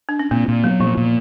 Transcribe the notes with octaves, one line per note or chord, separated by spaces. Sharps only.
D4
C#4
A#2 C4
A#2
F#3 B3
A#2 F3
A#2